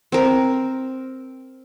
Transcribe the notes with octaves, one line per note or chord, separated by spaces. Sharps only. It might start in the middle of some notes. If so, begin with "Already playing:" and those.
C4 A#4